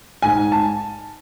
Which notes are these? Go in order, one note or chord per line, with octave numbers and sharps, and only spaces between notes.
G#2 G#5
A5